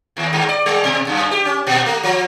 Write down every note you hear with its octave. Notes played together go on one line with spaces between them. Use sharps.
D#2
G2
D5
G3
B2
F#2
G4
C#4
A#2
A3
F3